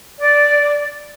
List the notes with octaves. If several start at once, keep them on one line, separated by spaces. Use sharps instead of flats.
D5